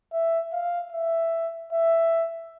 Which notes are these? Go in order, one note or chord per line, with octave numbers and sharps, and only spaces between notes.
E5
F5
E5
E5